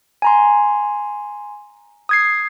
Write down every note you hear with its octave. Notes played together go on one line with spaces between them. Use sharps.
G#5 A#5 C6
D#6 G#6 C7